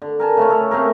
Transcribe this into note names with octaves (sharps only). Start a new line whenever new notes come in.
D3
A#4 G#5 A5
C#3 A3 C#4
G#4 A4 C#5
A3 C4 G#4 A#4